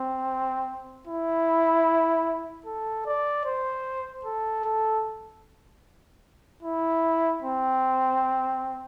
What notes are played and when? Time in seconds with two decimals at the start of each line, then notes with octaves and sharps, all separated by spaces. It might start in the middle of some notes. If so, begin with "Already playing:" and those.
Already playing: C4
1.07 E4
2.66 A4
3.06 D5
3.45 C5
4.25 A4
4.64 A4
6.63 E4
7.42 C4